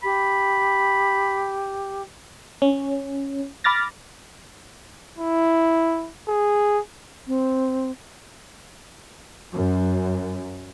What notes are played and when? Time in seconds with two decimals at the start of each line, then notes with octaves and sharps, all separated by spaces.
0.03 G4 B5
2.62 C#4
3.64 B5 D6 F6 A6 A#6
5.18 E4
6.28 G#4
7.27 C4
9.53 F#2